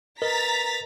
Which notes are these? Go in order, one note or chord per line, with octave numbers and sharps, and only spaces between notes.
A#4 B4 D#5 A#5 A6 B6